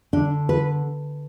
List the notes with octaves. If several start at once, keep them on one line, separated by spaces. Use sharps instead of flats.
D3 D4
B4